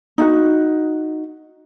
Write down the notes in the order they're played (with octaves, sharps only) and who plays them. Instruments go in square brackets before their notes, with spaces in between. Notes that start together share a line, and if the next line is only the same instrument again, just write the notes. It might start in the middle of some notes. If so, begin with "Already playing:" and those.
[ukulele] D#4 E4 F#4